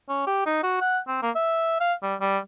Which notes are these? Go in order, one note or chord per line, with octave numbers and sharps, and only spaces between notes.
C#4
G4
D#4
F#4
F#5
C4
A#3
E5
F5
G3
G3